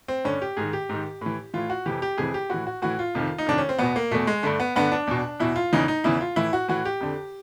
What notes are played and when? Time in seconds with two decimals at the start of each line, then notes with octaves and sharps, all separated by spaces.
0.08 C4
0.25 G2 D3 C#4
0.42 G4
0.57 G#2 D#3 G#4
0.73 G4
0.89 G#2 D#3
1.21 A2 E3
1.54 A2 E3 F4
1.70 F#4
1.86 F2 C3 E3 G4
2.02 G4
2.18 F2 C3 E3 G#4
2.34 G4
2.50 A2 E3 F#4
2.67 F#4
2.82 A2 E3 F#4
2.99 F4
3.15 F2 C3 D#3
3.38 D#4
3.46 F2 C3 D#3 D4
3.58 C#4
3.69 C4
3.78 E2 B2 B3
3.96 A#3
4.11 E2 B2 A3
4.27 G#3
4.43 G2 D3 A3
4.60 B3
4.76 G2 D3 B3
4.92 D4
5.07 E2 B2
5.39 E2 B2 E4
5.56 F4
5.73 E2 C#3 E3 D#4
5.88 D#4
6.04 E2 C#3 E3 E4
6.21 F4
6.36 A2 E3 E4
6.53 F#4
6.68 A2 E3 F#4
6.85 G4
7.01 F2 D3